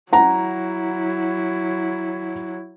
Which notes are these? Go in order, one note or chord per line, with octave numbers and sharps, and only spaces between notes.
F#3 E4 F#5 A#5